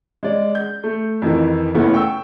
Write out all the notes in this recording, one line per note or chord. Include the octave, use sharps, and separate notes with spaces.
G#3 D5
G6
A3
F2 D#3 E3
F#1 C#3 A3 B3 E4
G5 C#6 E6